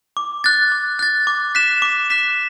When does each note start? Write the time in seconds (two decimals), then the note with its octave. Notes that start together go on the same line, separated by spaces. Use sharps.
0.17 D6
0.44 F#6 A6
0.72 D6
0.99 F#6 A6
1.27 D6
1.55 F#6 B6 E7
1.82 D6
2.10 F#6 B6 E7